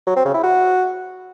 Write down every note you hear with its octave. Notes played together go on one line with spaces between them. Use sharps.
F#3
C4
C#3
E4
F#4